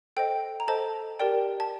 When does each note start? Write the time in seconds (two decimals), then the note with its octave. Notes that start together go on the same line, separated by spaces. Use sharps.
0.17 A4 C5 D#5 G5
0.60 A#5
0.68 A4 C5 D#5 A5
1.19 G4 A#4 D5 G5
1.60 A5